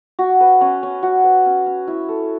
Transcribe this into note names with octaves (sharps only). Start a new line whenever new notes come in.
F#4
B4
C#4
C#4
F#4
B4
C#4
C#4
E4
A4